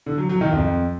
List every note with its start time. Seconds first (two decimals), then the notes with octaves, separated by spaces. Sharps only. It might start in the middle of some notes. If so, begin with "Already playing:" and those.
0.06 D3
0.18 F#3
0.29 F#3
0.41 D#3
0.53 F2